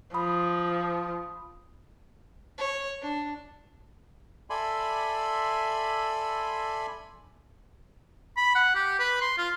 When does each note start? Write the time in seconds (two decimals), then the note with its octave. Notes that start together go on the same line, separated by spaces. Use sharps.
0.14 F3 B5 D#6
2.58 C#5
3.02 D4
4.50 A4 D5 E5 G#5 B5 C6
8.37 B5
8.55 F#5
8.75 G4
9.00 B4
9.21 C6
9.38 F4